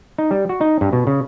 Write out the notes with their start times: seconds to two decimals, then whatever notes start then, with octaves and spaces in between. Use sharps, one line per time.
0.18 D#4
0.31 G3
0.49 F#4
0.61 D#4
0.81 G2
0.93 B2
1.07 C#3